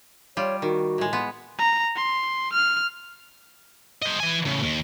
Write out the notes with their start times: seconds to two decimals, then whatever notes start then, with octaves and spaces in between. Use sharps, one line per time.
0.37 G3 F4 C#5
0.62 D#3 F#4
0.98 A2 G#3
1.13 B3 C6
1.59 A#5
1.96 C6
2.53 F6
4.02 C5 D#5
4.20 E3 G#5
4.46 A2 C#3
4.62 D#2